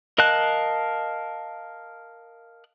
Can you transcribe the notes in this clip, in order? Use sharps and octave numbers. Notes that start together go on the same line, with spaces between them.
A#4 D#5 F5 A5 F#6